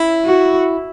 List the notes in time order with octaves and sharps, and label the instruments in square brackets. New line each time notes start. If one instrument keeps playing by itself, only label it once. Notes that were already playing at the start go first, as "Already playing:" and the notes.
Already playing: [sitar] E4
[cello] F#4